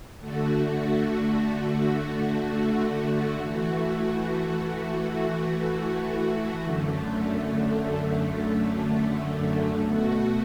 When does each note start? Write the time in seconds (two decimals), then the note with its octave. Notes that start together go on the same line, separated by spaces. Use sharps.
0.20 D3 A3 F#4
3.40 E3 A3 F#4
6.61 F#2 D3 A3
9.81 B2 A3 F#4